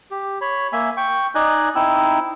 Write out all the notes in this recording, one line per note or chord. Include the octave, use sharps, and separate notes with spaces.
G4
C#5 B5
A#3 E5 G#5
G5 C#6
D#4 D5 D#5 G#5 F#6
C4 D#4 E4 E6